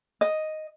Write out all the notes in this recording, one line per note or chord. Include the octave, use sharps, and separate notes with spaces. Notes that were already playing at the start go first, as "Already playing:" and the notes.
D#5